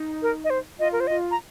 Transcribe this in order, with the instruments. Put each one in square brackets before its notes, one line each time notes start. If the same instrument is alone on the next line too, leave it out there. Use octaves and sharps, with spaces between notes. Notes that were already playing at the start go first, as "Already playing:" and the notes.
Already playing: [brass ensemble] D#4
[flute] A#4
D#5
C5
[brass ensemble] F4 [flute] D#5
[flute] A#4
C5
[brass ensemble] F4 [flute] D#5
[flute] A#5